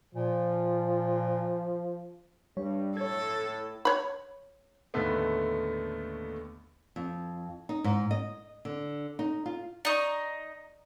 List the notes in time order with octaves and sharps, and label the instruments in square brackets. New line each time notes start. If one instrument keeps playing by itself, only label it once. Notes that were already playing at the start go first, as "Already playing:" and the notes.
[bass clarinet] A#2 [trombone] F3
[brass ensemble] G2 [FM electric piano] G3 C#5
[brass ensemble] A2 [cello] A4 [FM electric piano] C#5 G#6
[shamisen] C#5 B5
[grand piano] D#2 A2 D3 D#3 A3 B3
[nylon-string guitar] F2
D#4
G#2
D#5
D3
D#4
F4
[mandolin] D#4 D#5 [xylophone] D5 C#6